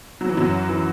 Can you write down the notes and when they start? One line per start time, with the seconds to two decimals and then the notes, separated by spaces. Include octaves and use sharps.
0.21 F#3
0.29 E3
0.37 F#2 F#3
0.69 E3